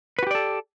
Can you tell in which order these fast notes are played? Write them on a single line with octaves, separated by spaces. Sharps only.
B4 F#4 G4 D5 A4